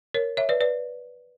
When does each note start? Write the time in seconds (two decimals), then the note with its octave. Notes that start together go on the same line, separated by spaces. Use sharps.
0.14 A#4 C#5
0.37 C#5 E5
0.49 B4 D5
0.61 B4 D5